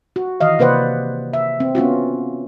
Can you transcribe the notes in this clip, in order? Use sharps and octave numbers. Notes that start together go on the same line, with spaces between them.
F#4
D#3 E3 D#5 F5
C3 A#3 B4 C5 D5 F#5
E5
C4
B3 C#4 F4 F#4